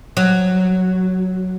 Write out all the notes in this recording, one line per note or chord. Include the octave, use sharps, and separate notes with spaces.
F#3